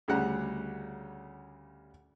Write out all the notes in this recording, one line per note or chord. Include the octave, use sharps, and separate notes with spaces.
D2 C#3 G3 F#5 A#5